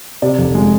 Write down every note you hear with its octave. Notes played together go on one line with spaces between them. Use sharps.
C3 D5
F1
G#3